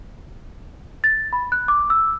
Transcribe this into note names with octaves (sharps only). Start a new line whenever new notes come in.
A6
B5
F#6
D6
E6